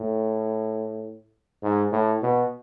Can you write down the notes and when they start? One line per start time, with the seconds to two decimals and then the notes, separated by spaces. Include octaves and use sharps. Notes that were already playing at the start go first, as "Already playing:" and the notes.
Already playing: A2
1.63 G#2
1.92 A2
2.22 B2